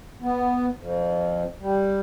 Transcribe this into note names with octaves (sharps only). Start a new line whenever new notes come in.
B3
F2
G3